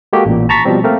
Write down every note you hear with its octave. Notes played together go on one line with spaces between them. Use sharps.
G#3 A#3 F#4 G4 A4
A1 A#2
A5 A#5 C#6 A6 B6
B2 F3 G3 C4
A3 A#3 C4 A#4